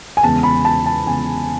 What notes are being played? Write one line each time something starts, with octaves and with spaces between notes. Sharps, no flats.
G#5
E2 C#3 G#3 B3 A5
B5
A5
A5
E2 C#3 G#3 B3 G#5